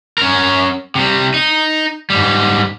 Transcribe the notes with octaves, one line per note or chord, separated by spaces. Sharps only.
C#4 A#4
C3 G3
D#4
G#2 G3